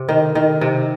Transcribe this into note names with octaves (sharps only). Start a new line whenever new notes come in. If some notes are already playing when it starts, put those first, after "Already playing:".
Already playing: C3
D#3
D#3
C3